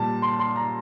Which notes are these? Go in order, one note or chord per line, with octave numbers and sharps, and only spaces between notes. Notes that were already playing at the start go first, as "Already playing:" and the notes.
Already playing: A#2 G3 A5
C6
C6
A#5